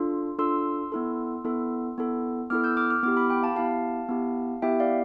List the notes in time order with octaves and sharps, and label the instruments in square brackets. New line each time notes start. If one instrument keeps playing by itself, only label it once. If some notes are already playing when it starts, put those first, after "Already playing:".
Already playing: [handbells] D4 F4 A4 C6
D4 F4 A4 C6 E6
B3 E4 A4
B3 E4 A4
B3 E4 A4
B3 E4 A4 D6 F6
E6 G6
D6 F6
D6 F6
B3 E4 G4 D6 F6
B5 D6
G5 B5
F5 A5
B3 E4 G4 F5 A5
B3 E4 G4
B3 E4 G4 E5 G5
D5 F5